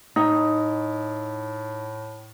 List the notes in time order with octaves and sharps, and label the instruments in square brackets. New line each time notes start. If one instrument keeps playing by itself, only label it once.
[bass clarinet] A2 [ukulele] D#4